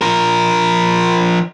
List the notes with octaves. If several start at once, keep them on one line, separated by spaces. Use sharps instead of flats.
F3 A#4